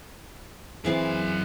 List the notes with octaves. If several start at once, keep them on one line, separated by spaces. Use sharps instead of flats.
F#2 E3 C4 G#4 D5 F5